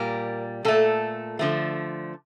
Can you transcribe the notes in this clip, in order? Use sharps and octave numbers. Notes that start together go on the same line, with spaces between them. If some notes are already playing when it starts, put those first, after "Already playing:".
Already playing: A#2 G3 A#4
A#2 A3 A4
D3 F3 A3